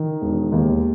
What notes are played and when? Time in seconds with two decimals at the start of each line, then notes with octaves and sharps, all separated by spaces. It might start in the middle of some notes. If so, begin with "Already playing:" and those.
Already playing: D#3
0.21 E1
0.52 D#2